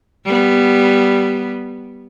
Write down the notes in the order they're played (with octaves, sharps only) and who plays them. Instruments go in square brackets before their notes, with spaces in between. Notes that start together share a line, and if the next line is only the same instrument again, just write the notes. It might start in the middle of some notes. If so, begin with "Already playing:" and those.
[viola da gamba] G3 B3